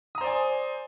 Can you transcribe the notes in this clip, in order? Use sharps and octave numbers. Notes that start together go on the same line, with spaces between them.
C5 D5 G#5 A#5 D#6